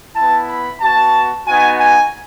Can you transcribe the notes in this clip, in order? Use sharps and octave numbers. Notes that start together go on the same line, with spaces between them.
B3 E4 A5
B5
B3 F#4 A5
B3 D#4 F#4 G#5
G#5